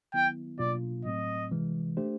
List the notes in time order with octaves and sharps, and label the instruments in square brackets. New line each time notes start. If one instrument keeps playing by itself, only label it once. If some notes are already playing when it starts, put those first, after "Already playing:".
[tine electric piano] D#3 F#3 B3 E4 [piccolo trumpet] G5
[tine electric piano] B2 F#3 A#3 D4 F4 [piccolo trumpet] D5
[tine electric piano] A2 F#3 A3 C4 [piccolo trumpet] D#5
[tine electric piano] C3 E3 G#3
A3 D4 G4 C5